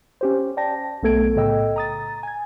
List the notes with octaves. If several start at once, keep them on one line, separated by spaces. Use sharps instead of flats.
C#4 G4 C5
D5 G5 A5 A#6
B1 A3 B3 A4 G#6 D7
A2 C#3 A4 D#5 G5 E6
A#5 D#6 A6
G#5 G#6